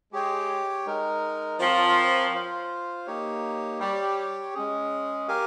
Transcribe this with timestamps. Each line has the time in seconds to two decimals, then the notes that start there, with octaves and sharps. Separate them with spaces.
0.13 G#3 G4 C#5 G5
0.86 G#3 D#4 A#4
1.60 F3 C4 F4 A#4 C#5
2.34 F4 C5 F5
3.06 A#3 D#4 G4 C#5
3.80 G3 G4 C#5 G5
4.54 G#3 C#4 G#4
5.28 G4 A#4 F5 G#5